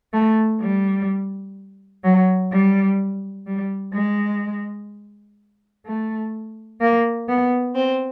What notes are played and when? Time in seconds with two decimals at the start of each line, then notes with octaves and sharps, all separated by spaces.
0.13 A3
0.60 G3
2.03 F#3
2.51 G3
3.46 G3
3.94 G#3
5.85 A3
6.81 A#3
7.28 B3
7.75 C4